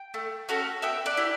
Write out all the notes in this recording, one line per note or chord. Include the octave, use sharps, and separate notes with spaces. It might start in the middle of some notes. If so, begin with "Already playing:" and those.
Already playing: G5
A3
C#4 F#4 A4
B3 E5 G5
D5 F#5
E4 G4